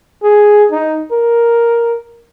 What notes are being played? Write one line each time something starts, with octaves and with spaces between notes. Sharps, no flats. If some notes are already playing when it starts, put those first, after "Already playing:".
G#4
D#4
A#4